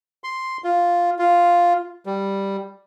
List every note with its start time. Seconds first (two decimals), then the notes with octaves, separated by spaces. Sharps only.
0.24 C6
0.64 F4
1.19 F4
2.06 G3